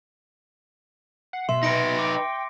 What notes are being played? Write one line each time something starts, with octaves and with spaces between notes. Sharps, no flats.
F#5 C7
B2 E5 C6
D#4 B4 A#6 C#7 D7
G5 D6